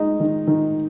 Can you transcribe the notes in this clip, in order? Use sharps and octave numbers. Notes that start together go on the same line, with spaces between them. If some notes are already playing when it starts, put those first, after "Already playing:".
Already playing: G#3 D#4
D#3
D#3